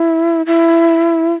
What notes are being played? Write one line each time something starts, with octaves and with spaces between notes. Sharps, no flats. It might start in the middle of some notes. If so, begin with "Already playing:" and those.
Already playing: E4
E4